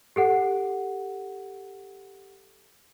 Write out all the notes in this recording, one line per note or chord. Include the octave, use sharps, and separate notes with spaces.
G4 A4 F#5